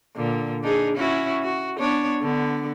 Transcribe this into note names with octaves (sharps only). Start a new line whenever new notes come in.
A#2 D3
D4 D#4 G#4
C#4 E4 F#4
F#4
B3 D4 C#5
D3 B3